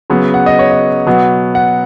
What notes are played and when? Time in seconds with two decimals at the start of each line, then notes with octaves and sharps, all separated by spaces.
0.10 C#3 F#3 B3
0.34 F#5
0.46 D#5
0.59 C#5
0.71 D#5
1.07 B2 F#3 B3
1.55 F#5